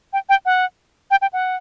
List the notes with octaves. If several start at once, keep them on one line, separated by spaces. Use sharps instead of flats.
G5
G5
F#5
G5
G5
F#5